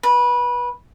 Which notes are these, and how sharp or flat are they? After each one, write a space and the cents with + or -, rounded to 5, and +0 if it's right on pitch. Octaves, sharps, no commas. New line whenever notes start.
B4 -20